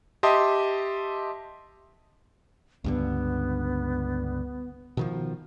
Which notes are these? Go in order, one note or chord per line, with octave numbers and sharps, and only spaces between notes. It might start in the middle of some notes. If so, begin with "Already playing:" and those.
G4 D#5 E5 A5 C6 D#6
C#2 G2 D3 B3
B2 D#3 F3